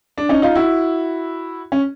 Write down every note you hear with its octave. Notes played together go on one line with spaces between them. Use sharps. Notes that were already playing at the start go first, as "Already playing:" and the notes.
D4
C#4 D#4
D#4 F4
E4 F#4
C#4